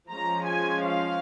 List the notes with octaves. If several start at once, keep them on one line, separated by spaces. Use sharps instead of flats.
F3 G#3 C#4 A#5
G#5
F5